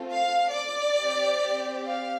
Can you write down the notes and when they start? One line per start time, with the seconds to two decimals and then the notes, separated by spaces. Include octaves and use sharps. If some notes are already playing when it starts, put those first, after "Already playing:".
Already playing: A3 C4 F4 A4
0.12 F5
0.55 D5
0.99 C4 G4
1.86 F5